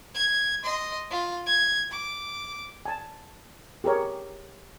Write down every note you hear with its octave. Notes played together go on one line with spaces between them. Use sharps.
G#6
D#5 C6
F4
G#6
D6
G#5 A5
G4 G#4 A#4 C#5